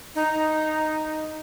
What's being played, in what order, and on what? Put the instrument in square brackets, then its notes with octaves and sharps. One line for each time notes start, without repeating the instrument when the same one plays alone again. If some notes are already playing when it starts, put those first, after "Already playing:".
[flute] D#4